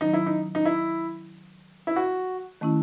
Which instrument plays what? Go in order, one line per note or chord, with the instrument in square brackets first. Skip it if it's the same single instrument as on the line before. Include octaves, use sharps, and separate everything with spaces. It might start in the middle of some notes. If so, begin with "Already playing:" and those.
[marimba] D#3 F#3 C#4 [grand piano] D#4
[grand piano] E4
D#4
D#4
E4
E4
F#4
[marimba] D#3 A3 C#4 E4